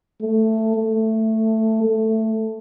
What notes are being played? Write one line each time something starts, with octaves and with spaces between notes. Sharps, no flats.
A3
A3
A3